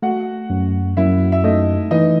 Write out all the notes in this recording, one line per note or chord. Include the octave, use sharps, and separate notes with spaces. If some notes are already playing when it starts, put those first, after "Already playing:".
A3 F#4 F#5
F#2
F#2 E4 E5
E5
A3 D#4 D#5
E3 D#4 D#5